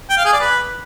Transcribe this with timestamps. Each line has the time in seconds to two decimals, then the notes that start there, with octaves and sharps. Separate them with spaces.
0.10 G5
0.18 F5
0.25 G#4
0.33 D5
0.40 B4